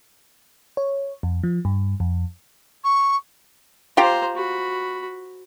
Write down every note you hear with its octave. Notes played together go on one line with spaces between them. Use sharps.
C#5
F2
F3
G2
F2
C#6
F4 G4 C5 A#5
F#4 B5